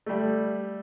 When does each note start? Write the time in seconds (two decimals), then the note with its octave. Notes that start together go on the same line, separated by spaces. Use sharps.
0.06 G3 A3